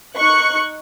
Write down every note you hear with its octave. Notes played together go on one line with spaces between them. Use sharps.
D#4 C#6 F#6 C#7